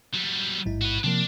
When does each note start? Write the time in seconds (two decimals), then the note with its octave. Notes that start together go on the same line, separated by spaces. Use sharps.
0.14 F#3 G3
0.66 A1 G#2 E4
0.82 F#4 B4
1.04 C3 F3 A#3 D4